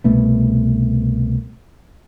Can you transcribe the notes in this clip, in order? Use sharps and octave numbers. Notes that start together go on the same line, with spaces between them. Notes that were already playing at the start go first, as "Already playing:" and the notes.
C2 B2 A3 B3